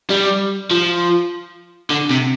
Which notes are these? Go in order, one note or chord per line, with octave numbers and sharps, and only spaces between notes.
G3
F3
D3
C3